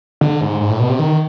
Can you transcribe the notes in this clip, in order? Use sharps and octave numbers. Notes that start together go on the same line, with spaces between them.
D3
G#2
G#2
A2
B2
C3
D#3